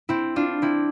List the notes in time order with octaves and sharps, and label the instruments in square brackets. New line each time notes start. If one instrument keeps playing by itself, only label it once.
[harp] C4 E4
D4 F4
C4 E4